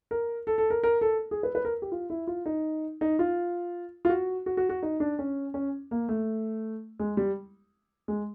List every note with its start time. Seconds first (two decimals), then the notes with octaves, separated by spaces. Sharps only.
0.11 A#4
0.47 A4
0.58 A4
0.70 A#4
0.83 A#4
1.01 A4
1.31 G#4
1.43 B4
1.55 B4
1.65 A#4
1.82 G4
1.92 F4
2.10 E4
2.27 F4
2.46 D#4
3.01 D#4
3.19 F4
4.05 F4
4.09 F#4
4.46 F#4
4.57 F#4
4.69 F#4
4.83 D#4
5.00 D4
5.19 C#4
5.54 C#4
5.91 A#3
6.09 A3
6.99 G#3
7.17 G3
8.08 G#3